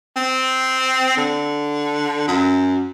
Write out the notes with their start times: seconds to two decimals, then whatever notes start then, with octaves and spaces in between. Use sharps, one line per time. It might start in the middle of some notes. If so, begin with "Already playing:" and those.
0.16 C4
1.17 D3
2.28 F#2